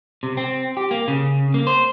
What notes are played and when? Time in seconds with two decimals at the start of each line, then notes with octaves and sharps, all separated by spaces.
0.23 C3
0.37 C4
0.77 G4
0.91 A#3
1.08 C#3
1.54 A#3
1.67 C5